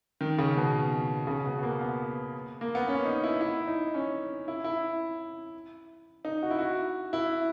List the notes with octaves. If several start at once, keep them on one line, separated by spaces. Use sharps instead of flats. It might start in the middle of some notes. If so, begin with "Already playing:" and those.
D#3
C#3
B2
C#3
B2
B3
A#3
B3
A#3
B3
C#4
D#4
E4
E4
D#4
C#4
E4
E4
D#4
F#4
E4
F#4
E4